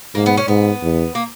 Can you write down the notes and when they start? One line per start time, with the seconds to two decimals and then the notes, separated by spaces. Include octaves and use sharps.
0.15 G#2 A#3
0.26 B3
0.37 C#4
0.48 G#2 B3
0.82 E2
1.15 A#3